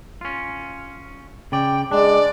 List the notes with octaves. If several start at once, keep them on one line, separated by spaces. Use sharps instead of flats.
C#4 F4
C#3 D5 G5
G#3 D4 D5